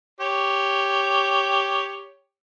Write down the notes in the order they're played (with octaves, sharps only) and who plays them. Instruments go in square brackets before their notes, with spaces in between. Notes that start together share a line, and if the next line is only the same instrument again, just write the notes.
[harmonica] G4 C#5